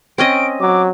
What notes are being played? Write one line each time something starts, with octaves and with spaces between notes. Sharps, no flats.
C4 C#4 D#5 D7
F#3 D6